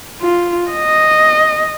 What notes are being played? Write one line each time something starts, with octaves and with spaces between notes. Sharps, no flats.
F4
D#5